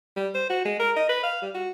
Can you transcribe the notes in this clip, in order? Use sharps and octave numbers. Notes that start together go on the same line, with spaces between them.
G3
C5
F#4
G#3
A#4
D#5
B4
F5
G3
F#4